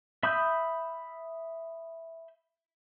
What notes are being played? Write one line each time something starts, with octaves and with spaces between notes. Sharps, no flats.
E5 B5 D#6 E6 G6